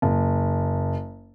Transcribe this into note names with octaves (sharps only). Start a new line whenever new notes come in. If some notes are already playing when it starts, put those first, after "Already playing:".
F#1